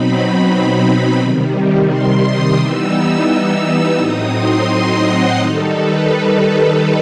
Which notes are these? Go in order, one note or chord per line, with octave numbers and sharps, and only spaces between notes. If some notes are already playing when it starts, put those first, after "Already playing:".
Already playing: B2 F#3 C4 D#4 B5
B5
C3 D#3 G3
C6
D#6
E3 G3 B3 D#4 E6
A2 F#3 C4 D#4 D#6
C6
D#5
F#5
D#3 G3 D#4 A4
B4
B4
A4